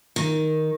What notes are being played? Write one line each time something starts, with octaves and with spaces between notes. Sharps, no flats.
D#3